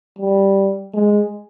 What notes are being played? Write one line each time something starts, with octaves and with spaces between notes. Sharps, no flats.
G3
G#3